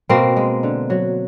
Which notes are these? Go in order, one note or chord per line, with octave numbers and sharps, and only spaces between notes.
B2 A#3 C4
G#3
D3
F#3